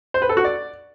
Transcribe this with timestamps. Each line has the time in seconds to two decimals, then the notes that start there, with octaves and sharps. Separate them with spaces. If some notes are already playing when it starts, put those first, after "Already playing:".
0.14 C5
0.22 B4
0.29 A4
0.37 F#4
0.44 D5